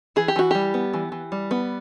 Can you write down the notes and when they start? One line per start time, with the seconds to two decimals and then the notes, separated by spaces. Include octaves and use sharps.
0.16 E3 G#4
0.28 G4
0.36 E3 F#4
0.51 G3 G4
0.74 B3
0.94 E3
1.12 E3
1.32 G3
1.51 B3